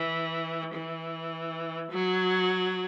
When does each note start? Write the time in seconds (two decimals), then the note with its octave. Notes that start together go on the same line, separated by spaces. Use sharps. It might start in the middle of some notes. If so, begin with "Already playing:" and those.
Already playing: E3
0.75 E3
1.91 F#3